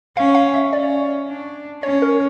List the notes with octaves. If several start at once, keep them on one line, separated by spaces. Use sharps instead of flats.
C#4 F5
F5
E5
C#4 D5
D4
C#4 C#5
A#4